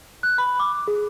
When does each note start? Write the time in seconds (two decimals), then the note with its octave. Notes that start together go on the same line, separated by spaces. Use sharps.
0.23 F#6
0.38 B5
0.59 D6
0.88 G#4